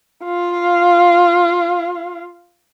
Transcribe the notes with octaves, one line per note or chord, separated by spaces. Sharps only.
F4 F5